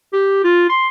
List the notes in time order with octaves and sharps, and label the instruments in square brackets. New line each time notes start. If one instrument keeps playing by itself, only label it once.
[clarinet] G4
F4
C6